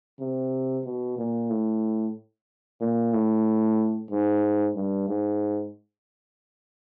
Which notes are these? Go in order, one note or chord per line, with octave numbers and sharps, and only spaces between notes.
C3
B2
A#2
A2
A#2
A2
G#2
G2
G#2